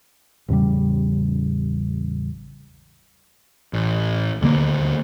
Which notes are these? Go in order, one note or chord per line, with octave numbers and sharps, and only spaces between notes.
A1 E2 C#3 G3
A1
D#1 D2 D3 A#3